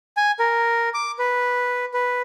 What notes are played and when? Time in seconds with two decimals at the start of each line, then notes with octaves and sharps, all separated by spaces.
0.17 G#5
0.39 A#4
0.94 D6
1.19 B4
1.94 B4